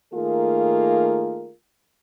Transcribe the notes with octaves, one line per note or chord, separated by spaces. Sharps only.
D#3 A3 A#3 F4 G#4 A#4